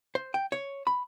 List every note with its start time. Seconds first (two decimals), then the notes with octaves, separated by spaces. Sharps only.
0.15 C5
0.34 G5
0.52 C#5
0.87 B5